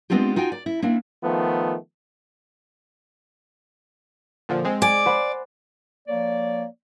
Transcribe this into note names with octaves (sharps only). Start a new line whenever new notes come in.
G#3 B3 C4 D4 F4 G4
D#4 F4 F#4 G5 G#5
D5
E4
A#3 C4 D4 E4
D#3 F3 A3 B3
A#2 D3 F3
G#3 C4
D5 G#5
C5 F#5 B5
F3 A#3 C#5 D5